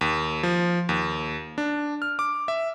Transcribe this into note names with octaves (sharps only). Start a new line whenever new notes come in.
D#2
F3
D#2
D4
F6
D6
E5